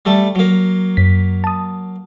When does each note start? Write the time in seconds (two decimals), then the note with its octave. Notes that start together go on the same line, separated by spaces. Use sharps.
0.05 G3 A3 A4
0.35 F#3 A#3
0.97 F#2 B6
1.44 A5 D#6